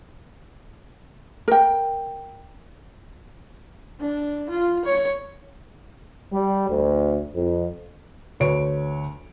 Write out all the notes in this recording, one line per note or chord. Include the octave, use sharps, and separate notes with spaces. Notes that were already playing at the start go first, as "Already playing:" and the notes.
A#4 G5
D4
F4
C#5
G3
D2
F2
D2 B4 C#5 D7